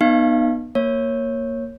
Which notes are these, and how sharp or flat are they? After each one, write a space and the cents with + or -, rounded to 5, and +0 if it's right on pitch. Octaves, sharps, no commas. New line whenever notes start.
B3 -15 D#4 -20 F5 -30
A#3 +0 C#5 -15